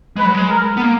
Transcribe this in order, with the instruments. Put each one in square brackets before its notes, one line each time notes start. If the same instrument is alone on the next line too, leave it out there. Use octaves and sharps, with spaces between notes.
[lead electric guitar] G#3 [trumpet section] B4
[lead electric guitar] F#3
G#3
[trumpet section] A#4
[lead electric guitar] B3
A#3